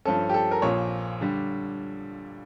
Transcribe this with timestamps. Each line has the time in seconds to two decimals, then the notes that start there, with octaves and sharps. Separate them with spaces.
0.05 G2 F3 C#4 A4
0.29 G4
0.34 A4
0.51 A#4
0.62 A#1 A#2 F3 C#5
1.21 D3 G3